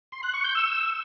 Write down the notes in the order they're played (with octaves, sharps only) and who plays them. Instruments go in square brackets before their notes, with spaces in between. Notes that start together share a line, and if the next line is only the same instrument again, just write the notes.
[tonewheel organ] C6
F#6
C#6
G6
E6